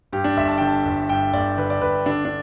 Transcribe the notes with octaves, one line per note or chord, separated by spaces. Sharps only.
G2 G4
D4
G1 E5
A5
D3 G5
A5
G1
G2 G5
G1 D5
D3 B4
D5
G1 B4
D3 D4
D4